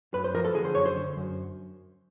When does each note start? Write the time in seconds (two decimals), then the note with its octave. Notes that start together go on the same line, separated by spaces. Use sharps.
0.13 F#2 B4
0.24 C5
0.34 F3 A#4
0.45 A4
0.55 D3 G#4
0.65 C5
0.75 F#2 C#5
0.86 C5
0.96 D3
1.16 F#2